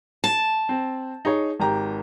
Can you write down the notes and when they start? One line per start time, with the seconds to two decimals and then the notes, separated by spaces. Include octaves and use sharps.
0.24 A5
0.69 C4
1.25 D#4 G#4 C#5
1.60 G#1 G4 A#5